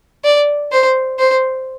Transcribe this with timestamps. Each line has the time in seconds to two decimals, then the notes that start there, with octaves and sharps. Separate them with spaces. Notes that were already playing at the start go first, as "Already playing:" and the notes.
0.24 D5
0.72 C5
1.19 C5